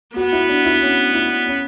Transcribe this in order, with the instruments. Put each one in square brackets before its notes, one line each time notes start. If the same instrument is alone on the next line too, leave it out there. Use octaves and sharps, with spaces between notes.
[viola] B3 [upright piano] F#4
[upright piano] E4
D4
E4
C#4
E4
C#4